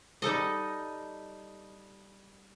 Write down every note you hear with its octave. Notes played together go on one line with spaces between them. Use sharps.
G3 D#4 A4 D#5